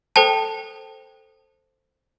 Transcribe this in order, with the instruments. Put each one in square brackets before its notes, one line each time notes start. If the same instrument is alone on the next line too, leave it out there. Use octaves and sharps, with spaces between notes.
[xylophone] A4 C5 G5 A5